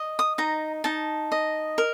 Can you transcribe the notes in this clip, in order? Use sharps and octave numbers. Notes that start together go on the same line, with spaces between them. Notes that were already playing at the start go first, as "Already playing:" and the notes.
Already playing: D#5
D#6
D#4 A#5
D#4 A5
D#5
A#4